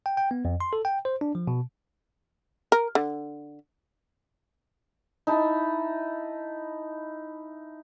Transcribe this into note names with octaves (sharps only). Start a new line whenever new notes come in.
G5
G5
B3
F2
C6
A4
G5
C5
D4
F3
B2
A#4
D3
D#4 E4 A5